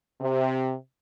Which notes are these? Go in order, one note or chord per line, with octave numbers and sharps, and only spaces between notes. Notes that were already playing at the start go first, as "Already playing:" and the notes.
C3